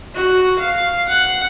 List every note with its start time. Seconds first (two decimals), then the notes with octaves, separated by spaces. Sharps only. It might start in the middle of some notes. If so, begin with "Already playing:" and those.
0.14 F#4
0.59 F5
1.08 F#5